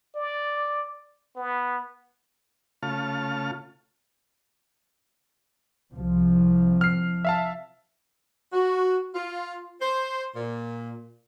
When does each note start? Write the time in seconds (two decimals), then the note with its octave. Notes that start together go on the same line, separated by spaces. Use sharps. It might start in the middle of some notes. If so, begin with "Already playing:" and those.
0.15 D5
1.36 B3
2.83 C#3 A3 F4 A5 F6
5.93 C2 C3 F3
6.81 F6 C7
7.25 E5 F5 A5
8.53 F#4
9.15 F4
9.82 C5
10.36 A#2